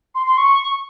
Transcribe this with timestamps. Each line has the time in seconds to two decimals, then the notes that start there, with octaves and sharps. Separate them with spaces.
0.15 C6
0.26 C6
0.37 C#6